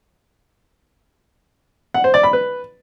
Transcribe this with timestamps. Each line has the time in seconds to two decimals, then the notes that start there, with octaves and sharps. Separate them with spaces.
1.94 F#5
2.04 C5
2.14 D5
2.23 B5
2.33 B4